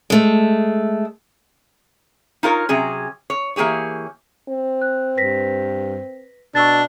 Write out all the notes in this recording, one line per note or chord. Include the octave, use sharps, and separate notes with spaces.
G#3 A3
D#4 F4 A#4 C#5
C3 F#3 C#4 G#4
C#5
E3 A#3 G4 G#4 C#5
C4
F#6
G2 B4 A#6 B6
B2 D4 C#6 E6 A6